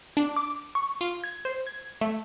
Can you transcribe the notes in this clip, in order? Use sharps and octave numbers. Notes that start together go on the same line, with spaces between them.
D4
D6
C#6
F4
G#6
C5
G#6
A3